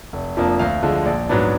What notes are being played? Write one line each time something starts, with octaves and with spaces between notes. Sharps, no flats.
F1
F2 F3 A#3 D4
D2 F5
D3 F3 G#3
A#1 D5
G#2 F#3 B3 D4